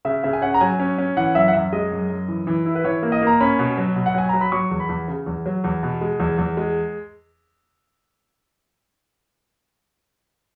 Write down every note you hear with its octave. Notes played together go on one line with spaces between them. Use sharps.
C#3 E5
C#3 E5
G#5
C#4 F#5
A#5
F#3 G#5
C#4
C#4
E3 F#5
F#2 E5
F#5
F#2 E5
G#3 D#5
F#2
F#2
E3
E3
E4
B4
E3 C#5
A#3
D#5
A#3
A#5
C#4 B5
B2
F#3
B2
F#5
F#3 G#5
F#3 A#5
B5
F#3 C#6
E2
B5
E2
C#3
E2
F#3
E2
B2
G#3
E2
E2
G#3